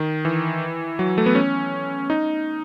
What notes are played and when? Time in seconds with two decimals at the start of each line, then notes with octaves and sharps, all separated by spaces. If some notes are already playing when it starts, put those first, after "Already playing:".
Already playing: D#3
0.25 E3
0.99 F#3
1.18 A3
1.26 B3
1.35 C#4
2.10 D#4